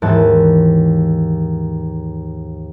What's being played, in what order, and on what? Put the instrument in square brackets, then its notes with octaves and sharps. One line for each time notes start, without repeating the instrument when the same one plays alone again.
[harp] D#2 G#2 E3 B3 A5